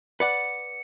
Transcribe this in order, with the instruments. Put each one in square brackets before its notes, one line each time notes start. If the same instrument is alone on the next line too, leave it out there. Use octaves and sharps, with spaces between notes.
[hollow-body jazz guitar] B4 D5 F#5 [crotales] C#7